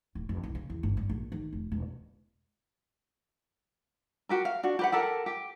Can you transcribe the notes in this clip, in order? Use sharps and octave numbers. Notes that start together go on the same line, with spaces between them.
D1
F1
C2
C#3
E2
G1
G2
A#1
D#3
F1
E1
F#4 G4 A#4
F5
D4 F#4
G4 B4 F#5
G4 A4 A#4 F#5
G4